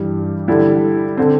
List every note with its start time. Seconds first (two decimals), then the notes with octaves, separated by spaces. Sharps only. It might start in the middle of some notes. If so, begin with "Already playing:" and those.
Already playing: G2 E3 G3
0.48 D3 G3 E4
1.17 D3 C4